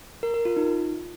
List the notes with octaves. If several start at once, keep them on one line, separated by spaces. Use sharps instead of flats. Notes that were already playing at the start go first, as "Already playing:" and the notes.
A#4
A#4
F4
D#4